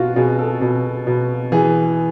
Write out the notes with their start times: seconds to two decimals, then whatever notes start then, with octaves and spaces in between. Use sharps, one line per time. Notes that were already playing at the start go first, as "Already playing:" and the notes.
Already playing: B2 F4 F#4
0.16 B2 G#4
0.39 A4
0.61 B2
1.07 B2
1.52 E3 G#4